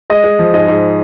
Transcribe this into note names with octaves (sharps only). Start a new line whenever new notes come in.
G#3 D#5
G#3
F3
G#2 D#5
G#2